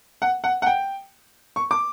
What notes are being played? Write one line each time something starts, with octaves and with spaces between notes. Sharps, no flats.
F#5
F#5
F#5
G5
C#6
D6